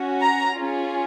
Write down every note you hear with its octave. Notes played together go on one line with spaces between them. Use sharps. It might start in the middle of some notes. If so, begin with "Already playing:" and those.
Already playing: C#4 F#4
A#5
C#4 F4 G#4